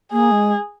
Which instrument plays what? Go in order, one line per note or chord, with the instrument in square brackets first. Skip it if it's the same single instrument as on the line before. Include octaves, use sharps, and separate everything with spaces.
[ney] A#3 [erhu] G#4
[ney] G#3